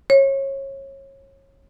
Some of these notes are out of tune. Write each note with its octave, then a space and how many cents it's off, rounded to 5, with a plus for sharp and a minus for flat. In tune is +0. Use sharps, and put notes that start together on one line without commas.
C#5 -25